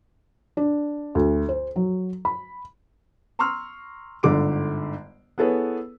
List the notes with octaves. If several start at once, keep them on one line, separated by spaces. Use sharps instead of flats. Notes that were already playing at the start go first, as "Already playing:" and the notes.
D4
D2
C5
F#3
B5
A#5 C6 C#6 E6 F6
G1 G#2 D3 D6 D7
B3 E4 G#4 A4 B4 C#5